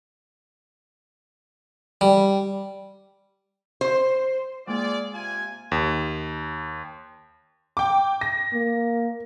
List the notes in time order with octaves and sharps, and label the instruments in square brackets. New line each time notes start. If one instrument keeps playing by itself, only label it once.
[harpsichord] G3
[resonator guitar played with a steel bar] C5
[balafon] G#3 A#3 [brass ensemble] F4 G#4 D5
[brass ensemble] C3 F4 G#5
[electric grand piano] D#2
[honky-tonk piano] G5 D6
A#6
[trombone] A#3